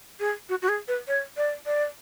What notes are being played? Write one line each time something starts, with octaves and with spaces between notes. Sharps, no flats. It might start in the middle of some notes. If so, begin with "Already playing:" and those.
G#4
F#4
F#4
G#4
B4
C#5
D5
D5